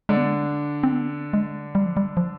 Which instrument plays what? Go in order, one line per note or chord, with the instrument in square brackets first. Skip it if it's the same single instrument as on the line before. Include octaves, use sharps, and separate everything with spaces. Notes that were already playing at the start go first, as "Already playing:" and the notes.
[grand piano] D3 D4 [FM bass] G#3
[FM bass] B3
G#3
C4
B3
G#3
G3
F3
G3
F3